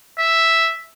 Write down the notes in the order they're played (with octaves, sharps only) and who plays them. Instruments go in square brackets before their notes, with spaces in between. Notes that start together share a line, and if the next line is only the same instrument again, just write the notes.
[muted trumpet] E5